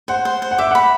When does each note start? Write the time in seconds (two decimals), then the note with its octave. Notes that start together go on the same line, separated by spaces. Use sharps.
0.08 C5 F#5
0.25 C5
0.42 C5
0.51 F#5
0.58 E5 D6
0.71 F#5 B5